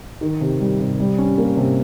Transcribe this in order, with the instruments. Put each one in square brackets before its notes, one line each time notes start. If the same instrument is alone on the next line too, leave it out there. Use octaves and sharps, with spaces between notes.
[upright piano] D#3
C3
G3
C3
G3
C#4
A#3
C3